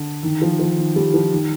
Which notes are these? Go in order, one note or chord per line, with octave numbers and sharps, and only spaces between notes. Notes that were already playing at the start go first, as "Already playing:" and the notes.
Already playing: D3
D#3
F3
F3
D#3
G3
F3
D#3